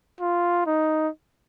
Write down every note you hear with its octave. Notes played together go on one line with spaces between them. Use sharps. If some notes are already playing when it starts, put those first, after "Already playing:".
F4
D#4